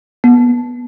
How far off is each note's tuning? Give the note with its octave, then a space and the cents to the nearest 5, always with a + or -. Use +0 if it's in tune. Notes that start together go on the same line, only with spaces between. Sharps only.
B3 -25